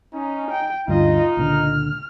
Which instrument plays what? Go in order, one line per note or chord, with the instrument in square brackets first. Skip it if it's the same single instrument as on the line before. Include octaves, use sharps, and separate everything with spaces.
[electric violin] C#4 [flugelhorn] D#4
[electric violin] G5
[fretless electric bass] D2 G2 D3 [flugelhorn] D#4 [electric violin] F4 D#5
[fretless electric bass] C#2 A#2 D3 [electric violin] F6